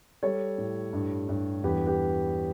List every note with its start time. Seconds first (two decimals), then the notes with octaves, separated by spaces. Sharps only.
0.23 G3 A4 C#5
0.58 A2
0.93 G2
1.29 G2
1.63 E2 G4 B4
1.86 G4 B4